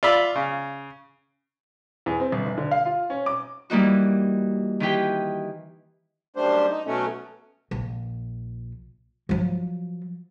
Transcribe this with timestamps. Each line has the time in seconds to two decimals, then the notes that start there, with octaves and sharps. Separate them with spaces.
0.03 F4 D5 E5 B5
0.36 C#3
2.06 E2
2.20 C4
2.32 G1
2.45 F1
2.58 D3
2.71 F5
2.86 F4
3.10 C#4
3.26 D6
3.70 E3 G3 A#3 D#4 F#4
4.80 D#3 E3 G4 G5
6.36 F#2 G3 A3 D4 C5
6.70 D#4
6.86 B2 F#3 A3 C#4
7.71 A#1
9.29 F3 F#3